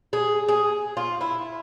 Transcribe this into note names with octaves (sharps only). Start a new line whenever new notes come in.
G#4
G#4
F4
E4